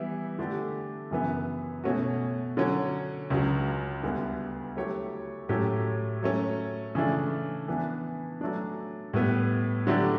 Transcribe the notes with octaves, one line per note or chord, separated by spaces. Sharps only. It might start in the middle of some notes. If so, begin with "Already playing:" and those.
Already playing: E3 G3 B3 E4
D3 A3 D4 G4
F#2 C#3 E3 B3
B2 A3 C#4 F#4
D3 F#3 C#4
C#2 C#3 F#3
D2 D3 G3 B3
F#3 A3 E4 G4 C#5
A2 F#3 A3 C#4 G4
F#3 A3 C#4
C#3 E3 A3 D4
E3 B3 D4
F#3 A3 D4
A2 G3 B3
D3 F#3 A3 D4 G4